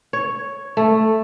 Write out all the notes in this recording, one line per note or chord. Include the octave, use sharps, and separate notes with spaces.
C#5
A3